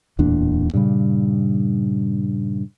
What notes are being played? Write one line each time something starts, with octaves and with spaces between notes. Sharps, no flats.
D1 E2 A#2 D4
G2 A#2 C#3 G3